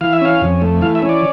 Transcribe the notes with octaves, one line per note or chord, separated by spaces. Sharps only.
E3 F5
E5
C#4 F5
F2
A3
E3 F5
E5
C#4
D5